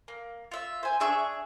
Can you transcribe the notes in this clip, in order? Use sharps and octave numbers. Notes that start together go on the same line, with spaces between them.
A#3
F4 E5
C5 G#5
D4 G#4 E5 C#6